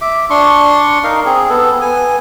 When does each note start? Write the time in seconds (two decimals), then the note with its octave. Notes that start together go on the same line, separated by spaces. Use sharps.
0.01 E5 D6
0.30 D4 C6 C#6
1.04 D#4 A#4 F5
1.25 C4 G#4
1.49 B3 A4
1.81 B3 G#5